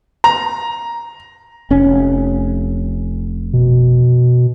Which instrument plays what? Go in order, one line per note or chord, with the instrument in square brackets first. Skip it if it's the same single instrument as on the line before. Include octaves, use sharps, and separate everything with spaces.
[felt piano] A#5
[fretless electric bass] F1 C#4
[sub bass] B2